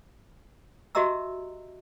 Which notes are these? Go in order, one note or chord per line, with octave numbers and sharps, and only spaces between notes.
F#4 G4 D#5 E5 A#5 E6